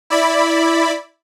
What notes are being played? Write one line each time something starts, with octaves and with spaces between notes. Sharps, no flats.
E4 D5 B5